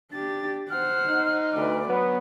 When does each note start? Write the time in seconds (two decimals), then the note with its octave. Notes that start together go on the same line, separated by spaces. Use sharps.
0.12 D4 G4 A6
0.70 C5 F#5 F6
1.07 D#4
1.54 D2 B4 D5
1.88 F#3 B3 B4